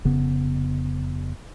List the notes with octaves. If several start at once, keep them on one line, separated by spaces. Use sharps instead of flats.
F1 C#3 B3